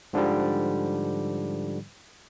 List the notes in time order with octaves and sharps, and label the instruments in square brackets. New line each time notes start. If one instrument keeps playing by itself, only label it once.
[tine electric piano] G#2 D3 F3 G3